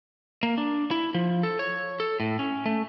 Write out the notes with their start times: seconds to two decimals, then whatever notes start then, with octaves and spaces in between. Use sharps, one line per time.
0.43 A#3
0.58 D4
0.91 E4
1.14 F3
1.43 A4
1.59 C#5
2.00 A4
2.20 A2
2.39 C#4
2.66 A3